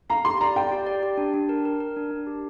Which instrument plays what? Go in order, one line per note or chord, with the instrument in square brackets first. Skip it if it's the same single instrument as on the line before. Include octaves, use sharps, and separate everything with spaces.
[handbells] F5 [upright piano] A#5
[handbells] G4 [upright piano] C6
[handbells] D5 [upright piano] A#5
[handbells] D5 [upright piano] G5
[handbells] G4
D5
G4
D4
D4
A#4
A#4
A#4
D4
D4
G4